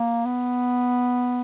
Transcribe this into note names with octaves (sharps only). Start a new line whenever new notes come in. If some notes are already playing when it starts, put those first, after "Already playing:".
Already playing: A#3
B3